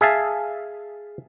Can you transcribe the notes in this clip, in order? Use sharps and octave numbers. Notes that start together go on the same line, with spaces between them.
G#4 E5 F5 A5